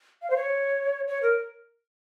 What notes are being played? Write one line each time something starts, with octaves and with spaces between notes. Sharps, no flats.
F5
C5
C#5
C#5
A#4